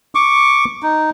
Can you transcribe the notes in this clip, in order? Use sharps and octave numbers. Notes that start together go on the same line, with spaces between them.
C#6 D6
D#4